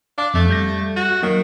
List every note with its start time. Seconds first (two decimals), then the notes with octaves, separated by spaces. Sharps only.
0.18 D4 F5
0.34 F2 A3
0.49 G3 G6 A#6
0.96 F#4
1.23 D#3 F#3 A#3